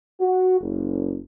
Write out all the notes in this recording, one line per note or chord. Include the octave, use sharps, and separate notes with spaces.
F#4
F#1